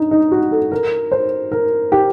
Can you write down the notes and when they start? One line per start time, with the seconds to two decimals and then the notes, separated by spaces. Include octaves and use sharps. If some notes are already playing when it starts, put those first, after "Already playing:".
Already playing: D4 D#4
0.11 D#4
0.32 F#4
0.51 A4
0.71 A#4
1.12 C5
1.52 A#4
1.92 G4